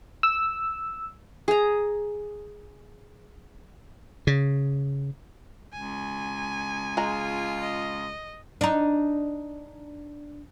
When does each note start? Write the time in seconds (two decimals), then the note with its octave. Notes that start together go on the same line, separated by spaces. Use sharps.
0.23 E6
1.48 G#4 A#5
4.27 C#3
5.73 C#2 G#5
6.97 G#3 F4 A#5
7.61 D#5
8.61 D4 D#4